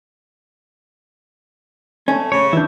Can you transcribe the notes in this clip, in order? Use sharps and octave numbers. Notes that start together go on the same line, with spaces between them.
A3 C#4
C#3 C#5
E3 D4 E4 G6